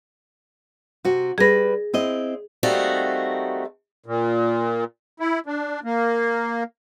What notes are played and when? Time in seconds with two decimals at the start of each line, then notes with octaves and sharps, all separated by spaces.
1.05 C3 F#4
1.38 G3 G#4 B4 A#6
1.93 C4 E4 D#5
2.63 G3 A3 A#3 C4 D#4 F#4
4.06 A#2
5.20 E4
5.46 D4
5.84 A#3